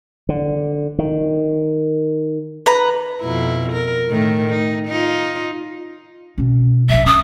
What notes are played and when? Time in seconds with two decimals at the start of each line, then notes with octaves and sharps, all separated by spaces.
0.29 D3
0.99 D#3
2.66 B4 A#5
3.22 F2 B2 E4
3.73 A#4
4.08 A2 D#3 A3
4.50 D#4
4.87 D#4 F4
6.38 B2 C#4
6.89 A#1 F3 E5
7.06 C#4 D#6